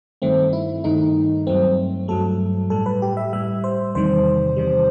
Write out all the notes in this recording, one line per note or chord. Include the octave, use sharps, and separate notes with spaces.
G2 D#3 A3 C4
E4
G2 D#3 A3 D#4
G2 F#3 A3 C4
G2 F#3 A3 A4
A2 G3 A4
B4
G4
E5
A2 G3 E5
C5
E2 C3 D#3 G3 C5
E2 C3 D#3 G3